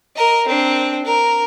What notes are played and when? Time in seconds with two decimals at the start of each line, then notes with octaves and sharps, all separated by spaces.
0.16 A#4 D#5
0.47 C4 D4
1.05 A#4